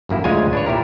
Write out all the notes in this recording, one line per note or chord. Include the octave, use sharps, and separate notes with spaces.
G1 F#2 A#3 E4
D2 G#3 F4 C#5 G#5
D4 B4 C#5
A#2 E4 G4 A#4